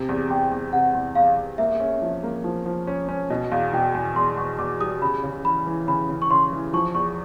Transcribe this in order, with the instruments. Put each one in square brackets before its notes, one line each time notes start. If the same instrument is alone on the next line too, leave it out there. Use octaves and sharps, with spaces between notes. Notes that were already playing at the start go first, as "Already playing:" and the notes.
Already playing: [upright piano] C3
E2
[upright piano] E2 [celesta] G5
[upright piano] E2
[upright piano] C3 [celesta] F#5
[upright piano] E2
[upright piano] E2 [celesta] F5
[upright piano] E2
[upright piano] A#3 [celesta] E5
[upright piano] C#4
F3
A#3
F3
F3
C#4
C#4
[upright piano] B2 [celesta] D#5
[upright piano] E2 [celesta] F5
[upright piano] B2 [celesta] G5
[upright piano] E2 [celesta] G#5
[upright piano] E2 [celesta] C6
[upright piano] E2 [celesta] C#6
[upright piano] E2 [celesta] D6
[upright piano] G3 [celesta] D#6
[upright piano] C#3 [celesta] B5
[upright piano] C#3
[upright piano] E3 [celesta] B5
[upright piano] E3
[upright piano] C#3 [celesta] B5
[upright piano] C#3
[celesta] C#6
[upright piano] C#3 [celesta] C6
[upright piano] E3
[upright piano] F3 [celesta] C#6
[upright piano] E2 [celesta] C#6